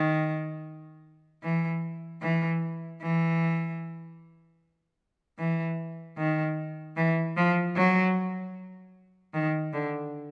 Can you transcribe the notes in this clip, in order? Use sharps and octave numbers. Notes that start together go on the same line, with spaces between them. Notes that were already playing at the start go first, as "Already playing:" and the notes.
Already playing: D#3
E3
E3
E3
E3
D#3
E3
F3
F#3
D#3
D3